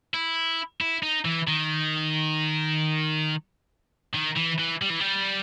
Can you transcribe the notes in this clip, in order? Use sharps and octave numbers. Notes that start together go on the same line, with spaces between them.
E4
E4
D#4
E3
D#3
D#3
E3
E3
G3
E3
G3